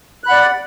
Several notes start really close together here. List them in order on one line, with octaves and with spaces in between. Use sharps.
F#6 B5 F#5 D5